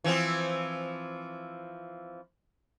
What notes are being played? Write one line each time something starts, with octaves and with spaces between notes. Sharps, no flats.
E3 F3 C4